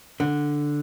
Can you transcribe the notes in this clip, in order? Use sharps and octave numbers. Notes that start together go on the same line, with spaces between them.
D3